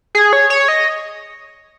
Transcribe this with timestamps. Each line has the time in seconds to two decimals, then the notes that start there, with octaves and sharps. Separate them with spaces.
0.15 G#4
0.33 C#5
0.50 C#5
0.68 D#5